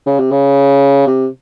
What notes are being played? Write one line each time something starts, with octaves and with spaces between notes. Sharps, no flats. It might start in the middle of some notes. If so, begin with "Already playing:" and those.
C#3
C3
C#3
C3